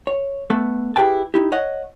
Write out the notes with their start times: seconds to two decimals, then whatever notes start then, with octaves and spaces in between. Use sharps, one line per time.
0.07 C#5
0.50 A3 B3 A4
0.96 E4 G4 G#4 B4 G5 A5
1.34 D#4 E4 G4
1.52 C#5 D#5 F#5